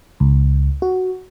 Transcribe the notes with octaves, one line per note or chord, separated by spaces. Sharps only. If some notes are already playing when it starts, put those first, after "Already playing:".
C#2
F#4